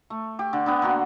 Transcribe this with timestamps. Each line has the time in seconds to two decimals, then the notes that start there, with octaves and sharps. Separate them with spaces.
0.10 A3
0.39 G4
0.53 D3
0.66 D3 B3 G5
0.82 D3 A#3 F#4